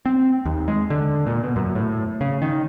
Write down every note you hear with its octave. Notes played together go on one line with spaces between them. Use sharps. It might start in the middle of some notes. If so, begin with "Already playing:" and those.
C4
D#2
G#3
D3
A#2
B2
F#2
A2
C#3
D#3